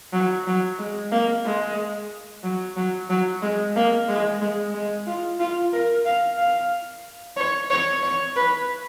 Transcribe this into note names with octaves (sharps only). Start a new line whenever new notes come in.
F#3
F#3
G#3
A#3
G#3
F#3
F#3
F#3
G#3
A#3
G#3
G#3
G#3
F4
F4
A#4
F5
F5
C#5
C#5
C#5
B4